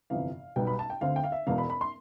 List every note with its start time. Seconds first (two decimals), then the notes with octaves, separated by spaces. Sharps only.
0.10 G1 F2 C3 E3 F5
0.56 B1 B2 G3 B3 G5
0.67 B5
0.79 A5
0.90 G5
1.01 D2 D3 A3 C4 F5
1.16 G5
1.24 F5
1.32 E5
1.47 E1 E2 B2 F5
1.58 B5
1.70 B5
1.81 C6